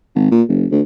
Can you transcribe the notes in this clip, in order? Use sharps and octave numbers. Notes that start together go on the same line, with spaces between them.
G#1
A#2
F#1
D2